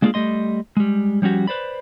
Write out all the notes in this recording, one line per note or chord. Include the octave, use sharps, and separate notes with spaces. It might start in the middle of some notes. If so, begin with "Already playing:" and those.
G#3 A#3 D4 F4 G4 G#4
G3 A3 D#5 C6
G3 G#3
F3 G3 C#4 F#4 G4
B4 C5 D5 B5